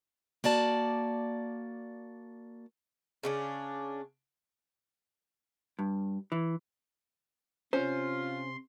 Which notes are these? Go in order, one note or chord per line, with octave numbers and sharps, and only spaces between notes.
A#3 F#4 D5 A5
C#3 C#4 D4
G2
E3
C3 C#4 F4 C5 C6